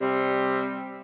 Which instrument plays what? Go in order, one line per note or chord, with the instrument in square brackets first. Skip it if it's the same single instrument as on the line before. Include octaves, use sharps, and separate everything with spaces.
[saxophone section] C3 G3